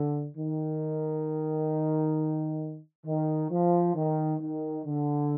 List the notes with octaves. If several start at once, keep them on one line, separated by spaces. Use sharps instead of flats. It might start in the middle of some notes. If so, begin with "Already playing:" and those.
Already playing: D3
D#3
D#3
F3
D#3
D#3
D3